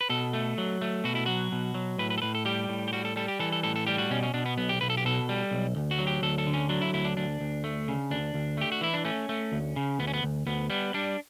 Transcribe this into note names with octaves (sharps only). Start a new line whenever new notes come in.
B4
B2 A4
A3
F#3
A3
B2 F#4
E4
F#3 F#4
B2
F#3
A2 B4
B4
A4
A2 B4
A4
G3 G4
A2
G4
G3 F#4
A4
G3 A4
G4
E3 A4
A4
A2 A4
A4
G3 G4
F#4
B2 C#4
C#4
B2 D4
B3
B1 B3
G4
B1 B4
A4
G4
B2 A4
G3
B1
D2
F#4
F#3
G4
D2 A4
A4
D3
C#4
F#3 D4
E4
D2 E4
D4
D2 D4
D2
A3
C#3
D2 D4
D2
A3 G4
F#4
E3 E4
D4
A3 C#4
A3
D2
C#3
D2 B3
C#4
B3
D2
D2 B3
G3 B3
G3 D4